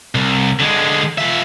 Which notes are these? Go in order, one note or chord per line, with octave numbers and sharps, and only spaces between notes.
C2
D3 G#3
F3 E5